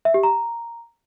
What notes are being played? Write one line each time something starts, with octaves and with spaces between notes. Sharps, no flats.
E5
G4
A#5